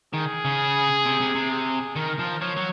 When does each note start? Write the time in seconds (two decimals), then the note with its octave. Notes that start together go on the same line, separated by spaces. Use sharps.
0.14 D#3 G#4
0.45 C#3
1.05 C3
1.20 C3
1.35 C3
1.50 G#4
1.96 D#3 A#4
2.19 F3
2.41 F3 C#5
2.56 F#3